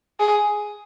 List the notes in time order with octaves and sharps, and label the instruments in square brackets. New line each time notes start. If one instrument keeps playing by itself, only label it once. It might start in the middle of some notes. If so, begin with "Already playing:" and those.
[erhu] G#4